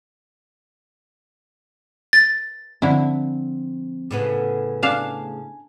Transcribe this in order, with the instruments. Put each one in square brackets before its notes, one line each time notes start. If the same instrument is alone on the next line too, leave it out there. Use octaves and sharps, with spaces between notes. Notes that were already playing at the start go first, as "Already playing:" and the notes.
[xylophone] A6
[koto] D3 E4 [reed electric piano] F3 C4
[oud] A2 C#3 B3
[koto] D4 F5 A5 [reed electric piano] G#5